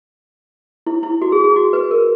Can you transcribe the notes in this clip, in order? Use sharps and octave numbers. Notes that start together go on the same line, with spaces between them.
E4
E4
F#4
G#4
G#4
F#4
B4
A#4